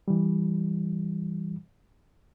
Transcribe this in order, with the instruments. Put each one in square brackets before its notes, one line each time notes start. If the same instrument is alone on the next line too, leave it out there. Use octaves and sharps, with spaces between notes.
[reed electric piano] E3 G3